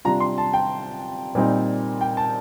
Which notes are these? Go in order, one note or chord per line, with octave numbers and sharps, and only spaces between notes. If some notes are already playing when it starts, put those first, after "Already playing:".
C3 G3 D4 F4 A#5
C6
A5
G5
A#2 G3 C4 D#4
G5
A5